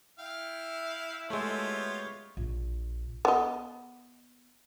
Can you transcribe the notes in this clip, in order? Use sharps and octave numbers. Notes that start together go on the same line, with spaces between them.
E4 F5 G5
G#3 A3 B3 F4 G4 C#5
A#1
B3 D#5